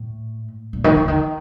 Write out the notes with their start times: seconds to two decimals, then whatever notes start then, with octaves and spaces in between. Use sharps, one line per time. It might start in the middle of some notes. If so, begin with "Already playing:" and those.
Already playing: A2
0.73 A#2
0.84 D#3
0.96 E3
1.03 D3
1.08 D#3